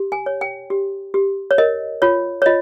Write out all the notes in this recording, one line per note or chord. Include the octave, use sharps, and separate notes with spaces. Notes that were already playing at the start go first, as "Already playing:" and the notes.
Already playing: G4
G#5
C#5
G5
G4
G4
C#5
A#4 D#5
F4 C#5
C#5
F4 D#5